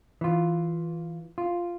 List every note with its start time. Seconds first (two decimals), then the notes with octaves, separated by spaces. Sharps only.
0.21 E3 F4
1.38 F4